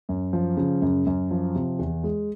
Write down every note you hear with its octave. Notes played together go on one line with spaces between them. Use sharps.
F#2
F3
C#3
F#2
F#2
F3
C3
E2
G#3